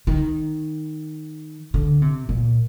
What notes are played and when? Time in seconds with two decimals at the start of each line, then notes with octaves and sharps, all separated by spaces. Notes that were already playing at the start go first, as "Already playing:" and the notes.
0.07 D#3
1.74 D3
2.02 C3
2.29 A#2